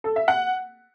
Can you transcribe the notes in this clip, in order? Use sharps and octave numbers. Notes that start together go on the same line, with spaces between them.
A4
E5
F#5